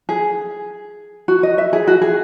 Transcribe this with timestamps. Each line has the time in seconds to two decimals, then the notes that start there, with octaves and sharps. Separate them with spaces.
0.09 G#4
1.28 F#4
1.43 D#5
1.58 E5
1.73 G#4
1.88 F#4
2.02 G#4